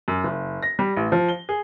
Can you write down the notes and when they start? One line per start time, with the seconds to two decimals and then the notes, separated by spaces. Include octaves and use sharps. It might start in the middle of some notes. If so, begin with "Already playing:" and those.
0.08 F#2
0.24 F#1
0.63 A#6
0.79 G3
0.97 A1
1.12 F3
1.29 G7
1.49 G#4